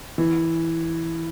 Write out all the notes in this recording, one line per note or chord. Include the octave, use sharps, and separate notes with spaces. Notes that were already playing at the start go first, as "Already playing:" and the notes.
E3